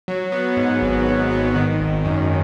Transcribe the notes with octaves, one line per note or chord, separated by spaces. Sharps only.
F#3
B3
G#2
G#1
F#3
B3
D#3
G#1
F#2